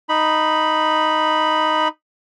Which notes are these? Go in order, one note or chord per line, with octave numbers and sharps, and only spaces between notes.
D#4 B5